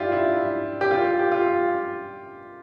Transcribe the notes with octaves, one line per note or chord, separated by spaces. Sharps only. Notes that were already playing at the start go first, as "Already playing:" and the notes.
Already playing: D4 E4 F4 G4
E4
G4
F4
G4
F4